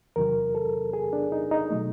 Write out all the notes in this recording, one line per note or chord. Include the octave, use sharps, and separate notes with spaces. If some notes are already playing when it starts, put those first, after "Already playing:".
E2 C3 D#3 F#3 A#4
A4
G#4
D4
D#4
D#4
B2 F#3 A3